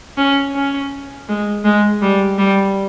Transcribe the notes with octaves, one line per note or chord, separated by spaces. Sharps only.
C#4
C#4
G#3
G#3
G3
G3